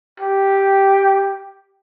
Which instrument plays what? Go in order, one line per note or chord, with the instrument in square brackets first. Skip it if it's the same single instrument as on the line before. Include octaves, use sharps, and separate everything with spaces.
[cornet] G4